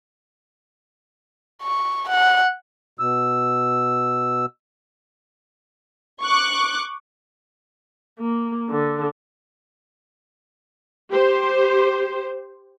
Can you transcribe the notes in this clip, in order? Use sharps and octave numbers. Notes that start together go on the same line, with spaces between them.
C#6
F#5
B2 E6
C#6 D6 F#6
A#3
D3
G4 C5